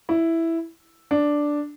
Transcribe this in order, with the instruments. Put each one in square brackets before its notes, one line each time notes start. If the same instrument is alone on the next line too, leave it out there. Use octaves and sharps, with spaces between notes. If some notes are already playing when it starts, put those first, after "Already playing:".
[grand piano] E4
D4